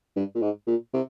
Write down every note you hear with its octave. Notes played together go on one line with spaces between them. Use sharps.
G2
A#2
G#2
A#2
C3